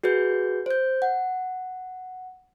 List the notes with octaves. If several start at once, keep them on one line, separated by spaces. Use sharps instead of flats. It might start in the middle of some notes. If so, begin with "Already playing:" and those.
F#4 G#4 B4 G6
C5 G6
F#5